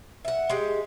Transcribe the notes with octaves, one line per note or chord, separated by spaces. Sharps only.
E5 F#5
G#3 G4